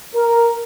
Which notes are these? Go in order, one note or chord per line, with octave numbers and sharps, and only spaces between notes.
A#4